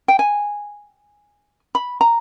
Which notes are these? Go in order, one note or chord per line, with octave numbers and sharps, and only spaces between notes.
G5
G#5
B5
A#5